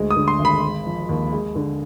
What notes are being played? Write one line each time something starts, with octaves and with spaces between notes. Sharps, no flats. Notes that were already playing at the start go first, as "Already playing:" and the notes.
Already playing: D2 G#3
D#6
D3
C6
G#1
B5
G#3
F3
D#2
G#3
D3